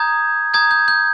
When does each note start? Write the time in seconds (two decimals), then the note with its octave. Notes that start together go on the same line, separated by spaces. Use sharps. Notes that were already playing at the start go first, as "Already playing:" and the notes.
Already playing: A#5 D#6 G6 G#6
0.54 A#5 D#6 G6 G#6
0.71 G6
0.88 G6